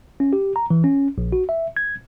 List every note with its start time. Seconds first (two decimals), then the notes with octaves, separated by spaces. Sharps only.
0.20 C#4
0.33 G4
0.56 A#5
0.70 E3
0.84 C#4
1.18 A#1
1.32 F#4
1.49 E5
1.77 G#6